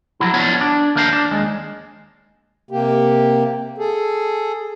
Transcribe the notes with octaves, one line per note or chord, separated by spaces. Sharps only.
F3 F#3 E4
B3 C#4 D4 F4 C#5
D4
D#2 A#3 A#4 C5 F5
D4
D#2 G#3
C3 A#3 G4
G#4 A4